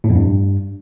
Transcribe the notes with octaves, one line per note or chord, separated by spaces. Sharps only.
A2
F2
G2